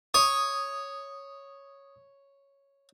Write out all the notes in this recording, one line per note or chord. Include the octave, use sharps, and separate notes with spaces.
C#5 D#6